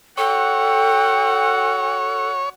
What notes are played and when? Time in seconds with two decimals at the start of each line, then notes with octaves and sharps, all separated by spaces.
0.18 F#4 A4 C#5 F#5 G5